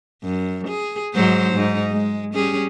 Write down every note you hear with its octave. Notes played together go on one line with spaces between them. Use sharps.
F#2
G#4
G#2 F#3 C5
G#2 D#4
G#3
G3 C#4 G#4